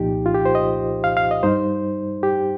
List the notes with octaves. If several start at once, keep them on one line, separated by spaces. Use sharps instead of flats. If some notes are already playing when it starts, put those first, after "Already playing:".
Already playing: C2 A#2 F3 D#4 G4
F4
G4
C5
D#5
F5
F5
D#5
G2 G3 D#4 C5
G4